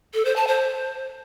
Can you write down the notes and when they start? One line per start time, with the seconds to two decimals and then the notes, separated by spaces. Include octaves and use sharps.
0.14 A4
0.25 C5
0.36 A5
0.47 C5